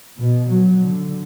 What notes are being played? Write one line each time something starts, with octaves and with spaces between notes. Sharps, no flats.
B2
F#3
D3